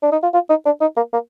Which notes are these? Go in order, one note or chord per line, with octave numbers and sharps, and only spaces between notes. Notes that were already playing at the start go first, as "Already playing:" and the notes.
D4
D#4
F4
F4
D#4
D4
D#4
A#3
A#3